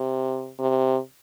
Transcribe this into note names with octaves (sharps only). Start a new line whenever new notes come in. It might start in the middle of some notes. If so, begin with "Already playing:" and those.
Already playing: C3
C3